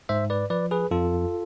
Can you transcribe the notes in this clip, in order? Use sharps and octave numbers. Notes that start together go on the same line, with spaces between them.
G#2 C5 E5
B4 D5
F3 B4 D5
G#4 B4
F2 F4 A4